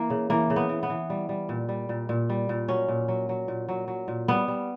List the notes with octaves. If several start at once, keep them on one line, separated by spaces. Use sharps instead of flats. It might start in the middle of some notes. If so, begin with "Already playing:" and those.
Already playing: E3 A#3
C#3
E3 A#3
C#3
B3
E3
B3
E3
G3
G3
A#2
G3
A#2
A#2
G3
A#2
F#3 C#4
A#2
F#3
F#3
A#2
F#3
F#3
A#2
G3 B3
G3